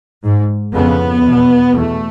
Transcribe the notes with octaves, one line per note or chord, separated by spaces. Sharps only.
G#2
F2 C#3 B3
E2 B2
E2 B2 A3